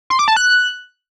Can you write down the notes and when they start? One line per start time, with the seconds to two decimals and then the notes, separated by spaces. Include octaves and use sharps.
0.10 C6
0.19 D6
0.28 A5
0.36 F#6